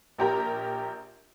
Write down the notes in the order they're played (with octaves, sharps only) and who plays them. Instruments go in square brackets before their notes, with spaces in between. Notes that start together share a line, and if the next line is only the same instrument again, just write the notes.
[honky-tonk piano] A#1 G4 A#4 A#5